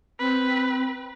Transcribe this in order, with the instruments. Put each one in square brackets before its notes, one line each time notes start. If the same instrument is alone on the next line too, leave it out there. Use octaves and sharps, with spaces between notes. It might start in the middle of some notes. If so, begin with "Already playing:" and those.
[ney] C4 [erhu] B4